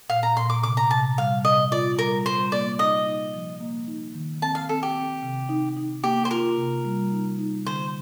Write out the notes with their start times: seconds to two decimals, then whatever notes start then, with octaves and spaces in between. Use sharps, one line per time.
0.09 A#2 F5
0.23 A#5
0.36 A#2 C6
0.50 D6
0.63 C3 D6
0.77 A#5
0.91 C3 A5
1.18 G3 F5
1.45 C3 D#5
1.71 F4 D5
1.99 G3 A#4
2.25 G3 C5
2.52 A#3 D5
2.79 D#4 D#5
3.06 D#4
3.34 F3
3.61 A#3
3.88 D#4
4.15 D#3
4.42 C4 A5
4.55 F5
4.69 C4 A4
4.83 G4
4.96 C4
5.23 C3
5.49 D#4
5.76 D#4
6.04 A#3 G4
6.25 C5
6.31 F4 A#4
6.58 C3
6.85 G3
7.12 D#4
7.39 D#4
7.65 D3 C5